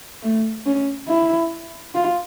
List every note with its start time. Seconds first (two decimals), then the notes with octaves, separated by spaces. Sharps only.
0.23 A3
0.66 C#4
1.08 E4
1.95 F4